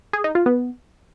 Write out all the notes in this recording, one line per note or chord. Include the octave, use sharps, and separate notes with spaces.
G#4
D#4
F4
B3